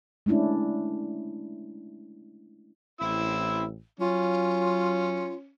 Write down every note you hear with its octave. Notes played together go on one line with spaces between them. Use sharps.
G#3 A3 C#4 D4 E4
A1 C4 E4 E6
F#3 C#4 F4